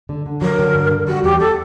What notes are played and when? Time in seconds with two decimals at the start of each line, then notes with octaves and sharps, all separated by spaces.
0.09 D3
0.26 D3
0.42 F#3 A#4
0.59 D3
0.74 G2
0.91 D3
1.07 G3 F#4
1.23 E2 G4
1.40 A4